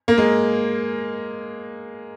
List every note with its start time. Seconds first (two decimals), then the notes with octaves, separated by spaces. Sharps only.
0.08 A#3
0.18 G#3